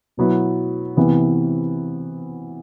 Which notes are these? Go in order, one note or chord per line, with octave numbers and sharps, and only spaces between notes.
B2 F#3 B3 E4
C3 E3 B3 E4